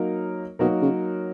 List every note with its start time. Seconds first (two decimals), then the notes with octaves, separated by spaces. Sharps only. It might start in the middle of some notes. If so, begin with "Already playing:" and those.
Already playing: F#3 A#3 D#4 F#4 A#4
0.59 B2 F#3 A#3 D#4 F#4 A#4
0.82 C#3